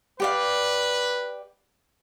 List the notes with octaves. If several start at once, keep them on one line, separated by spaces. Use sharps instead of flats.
G4 B4 D5 F5